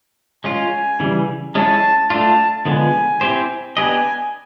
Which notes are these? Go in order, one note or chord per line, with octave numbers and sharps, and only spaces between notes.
G#3 C#4 F4 G#5
C#3 E3 G3
G#3 C#4 E4 G#4 C#5 A5
A3 D4 F4 A5
D3 F3 G#3 B3 G#5
C4 E4 G4 C5
B3 D4 G4 B4 D#5 G#5